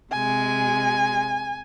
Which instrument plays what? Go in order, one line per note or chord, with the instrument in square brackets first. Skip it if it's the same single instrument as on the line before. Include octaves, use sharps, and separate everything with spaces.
[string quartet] C3 G#3 [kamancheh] G#5